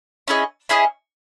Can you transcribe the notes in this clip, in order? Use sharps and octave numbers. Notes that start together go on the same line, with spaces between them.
C#4 E4 G#4 D#5
C#4 E4 G#4 D#5